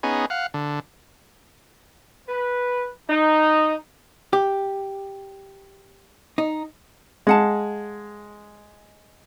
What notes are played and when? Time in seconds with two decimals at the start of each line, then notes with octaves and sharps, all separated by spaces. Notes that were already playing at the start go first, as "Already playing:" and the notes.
0.03 B3 C#4 D#4 G#4
0.30 F5 F#5
0.54 D3
2.28 B4
3.09 D#4
4.33 G4
6.38 D#4
7.27 G#3 F5 F#5 A5